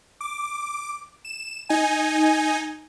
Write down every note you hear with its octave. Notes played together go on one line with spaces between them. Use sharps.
D6
E7
D#4 G#5